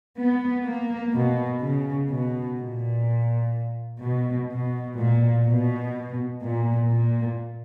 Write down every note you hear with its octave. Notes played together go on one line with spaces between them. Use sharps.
B3
A#3
B2
C#3
B2
A#2
B2
B2
A#2
B2
A#2
A#2